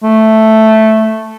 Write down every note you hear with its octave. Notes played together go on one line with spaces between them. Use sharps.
A3